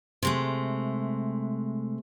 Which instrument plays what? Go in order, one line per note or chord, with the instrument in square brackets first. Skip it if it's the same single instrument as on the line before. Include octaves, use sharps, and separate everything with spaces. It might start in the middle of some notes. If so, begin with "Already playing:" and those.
[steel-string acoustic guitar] C3 G#3 A3